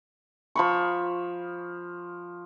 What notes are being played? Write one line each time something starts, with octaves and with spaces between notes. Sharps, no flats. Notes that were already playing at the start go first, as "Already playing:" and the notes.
F3 B5 C#6